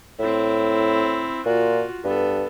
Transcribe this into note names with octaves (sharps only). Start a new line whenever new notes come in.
A2 C4 E4
A#2 F4 F#4
G2 B3 A4